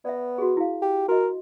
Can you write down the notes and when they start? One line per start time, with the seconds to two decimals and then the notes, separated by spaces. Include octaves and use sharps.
0.05 B3 D5 E5
0.38 F#4 G#4
0.57 E4 F5
0.82 G4
1.08 F#4 A#4 D#5